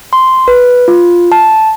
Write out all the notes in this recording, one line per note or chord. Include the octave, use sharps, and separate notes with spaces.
C6
B4
F4
A5